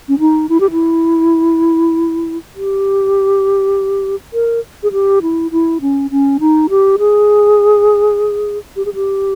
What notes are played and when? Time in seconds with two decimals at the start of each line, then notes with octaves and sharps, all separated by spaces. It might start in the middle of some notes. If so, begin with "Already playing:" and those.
0.09 C#4
0.19 D#4
0.49 E4
0.60 G4
0.71 E4
2.56 G4
4.33 A#4
4.83 G#4
4.92 G4
5.22 E4
5.51 E4
5.81 C#4
6.11 C#4
6.40 D#4
6.70 G4
6.99 G#4
8.76 G4
8.86 G#4
8.94 G4